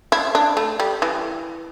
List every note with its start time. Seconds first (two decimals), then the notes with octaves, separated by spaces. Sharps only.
0.12 E4
0.35 D4
0.57 A3
0.80 G3
1.02 E3